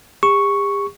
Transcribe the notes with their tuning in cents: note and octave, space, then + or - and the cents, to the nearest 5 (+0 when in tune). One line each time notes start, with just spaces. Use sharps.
G4 +45 C#6 +0